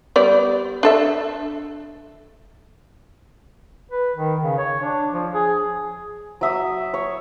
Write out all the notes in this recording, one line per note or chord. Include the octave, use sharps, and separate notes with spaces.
G3 B3 D5
D4 A4 E5
B4
D#3
C#3
C#5
D4
F3
G#4
F#3 E5 D#6
C#5